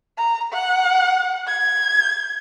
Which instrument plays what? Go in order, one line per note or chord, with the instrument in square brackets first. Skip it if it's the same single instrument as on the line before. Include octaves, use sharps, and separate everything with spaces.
[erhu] A#5
F#5
G#6